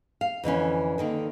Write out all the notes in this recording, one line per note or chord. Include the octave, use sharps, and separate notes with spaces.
F5
F2 D3 E3 C#4
D3 D#3 A#3